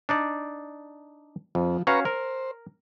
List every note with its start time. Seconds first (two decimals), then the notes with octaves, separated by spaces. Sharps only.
0.09 D4 D#4 D5
1.55 F2 F3
1.87 C#4 F#4 B4 F5 A#5 C#6
2.05 A#4 C5